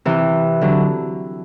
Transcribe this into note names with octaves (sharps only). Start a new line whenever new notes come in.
C3 E3
D3 F#3